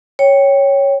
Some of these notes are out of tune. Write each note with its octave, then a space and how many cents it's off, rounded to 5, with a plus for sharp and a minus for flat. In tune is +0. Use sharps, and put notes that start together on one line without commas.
C#5 +0 G5 +0